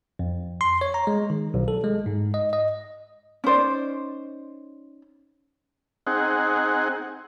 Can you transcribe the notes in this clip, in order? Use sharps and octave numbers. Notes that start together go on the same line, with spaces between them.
F2
C6
C#5
A#5
G#3
D#3
B1
A4
G#3
G#2
D#5
D#5
C#4 D#4 C5 D5
C4 D#4 G#4 F#5